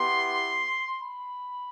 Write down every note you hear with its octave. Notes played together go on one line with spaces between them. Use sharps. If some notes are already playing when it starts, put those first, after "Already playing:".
Already playing: B3 E4 G4 C6
B5